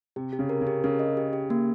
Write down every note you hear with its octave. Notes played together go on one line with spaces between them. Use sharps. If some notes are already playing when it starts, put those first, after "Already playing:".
C3 G4
G4
C#3
A#4
C#3
G4
C#3 A#4
D#5
G4
G4
A#3